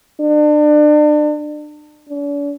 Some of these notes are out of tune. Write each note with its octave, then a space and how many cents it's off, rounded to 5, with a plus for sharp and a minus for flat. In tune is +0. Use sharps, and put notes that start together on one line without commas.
D4 +35
D4 -45